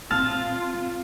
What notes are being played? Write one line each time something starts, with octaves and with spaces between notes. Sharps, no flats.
C4 F4 A5 F6